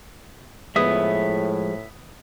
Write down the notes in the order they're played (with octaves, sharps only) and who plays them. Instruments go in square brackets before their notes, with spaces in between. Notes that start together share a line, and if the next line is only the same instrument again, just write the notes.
[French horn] A2 [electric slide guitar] F3 G#3 [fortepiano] B3 [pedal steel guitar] E5 D#6